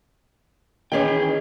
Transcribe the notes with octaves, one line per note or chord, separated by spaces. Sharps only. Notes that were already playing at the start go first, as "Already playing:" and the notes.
D#3 E3 C#4 G#4 G5